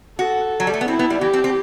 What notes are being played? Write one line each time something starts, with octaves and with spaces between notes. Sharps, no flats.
F#4 A4
F#3
G3
A3
B3
C4 E4
B3
G3
E3 G4
C4
C4